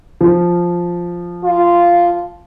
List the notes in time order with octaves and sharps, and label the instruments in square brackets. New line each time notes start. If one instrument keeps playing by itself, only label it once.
[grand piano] F3
[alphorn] F4